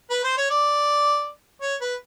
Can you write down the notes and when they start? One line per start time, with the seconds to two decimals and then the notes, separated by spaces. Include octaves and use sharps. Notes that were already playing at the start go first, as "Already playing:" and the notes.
0.10 B4
0.24 C5
0.37 C#5
0.50 D5
1.62 C#5
1.81 B4